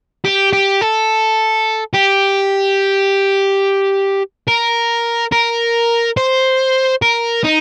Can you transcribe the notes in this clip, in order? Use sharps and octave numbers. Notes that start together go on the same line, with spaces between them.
G4
G4
A4
G4
A#4
A#4
C5
A#4
D#4